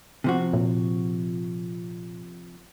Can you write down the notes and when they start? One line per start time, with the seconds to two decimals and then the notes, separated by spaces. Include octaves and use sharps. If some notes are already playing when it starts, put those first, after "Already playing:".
0.24 C3 F3 F#4
0.53 A#2